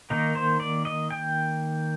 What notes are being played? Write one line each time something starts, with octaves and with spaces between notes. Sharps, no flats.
D#3 A#3 D#4
C5
D5
D#5
G5